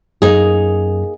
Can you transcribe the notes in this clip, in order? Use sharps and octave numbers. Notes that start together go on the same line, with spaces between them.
F#2 A#3 D#4 G#4